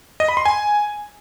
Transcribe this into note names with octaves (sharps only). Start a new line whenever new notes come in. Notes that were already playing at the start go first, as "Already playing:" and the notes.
D#5
B5
C6
G#5